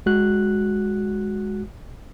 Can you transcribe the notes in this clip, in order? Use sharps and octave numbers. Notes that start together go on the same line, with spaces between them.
G#3 F#4 F#6